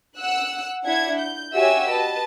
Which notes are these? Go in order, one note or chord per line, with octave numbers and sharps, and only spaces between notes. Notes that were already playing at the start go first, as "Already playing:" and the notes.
F#5 E6 F#6
D4 E4 E5 F#5 G#6
G6
F#4 G4 C#5 E5 G#5 E6
B4 D#5 A5